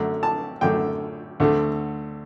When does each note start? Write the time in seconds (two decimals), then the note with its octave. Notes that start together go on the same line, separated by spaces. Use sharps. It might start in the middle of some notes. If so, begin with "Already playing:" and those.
Already playing: F#2 D3 A3
0.23 A5
0.61 F#2 D3 A3 G5
1.40 D2 D3 A3